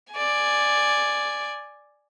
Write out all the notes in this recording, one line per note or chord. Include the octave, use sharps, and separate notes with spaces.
D5 G#5